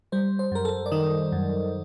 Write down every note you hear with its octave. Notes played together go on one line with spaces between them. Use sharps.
G3 C5
C5
F#2 A#4
A4
D5
D#3 D#5
F#2